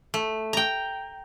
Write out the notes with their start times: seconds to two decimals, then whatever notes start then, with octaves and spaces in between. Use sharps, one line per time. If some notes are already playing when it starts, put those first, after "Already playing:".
0.14 A3
0.53 G5 A#5